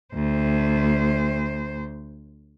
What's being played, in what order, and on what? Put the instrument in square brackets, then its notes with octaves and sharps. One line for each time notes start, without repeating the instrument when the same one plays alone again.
[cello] D2 C5